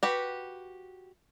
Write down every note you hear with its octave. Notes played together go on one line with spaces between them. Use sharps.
F#4 G4 B4